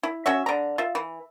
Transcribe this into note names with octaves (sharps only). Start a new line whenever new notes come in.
E4
C#4 F#4 E5
D3 A#5
F4 E5
E3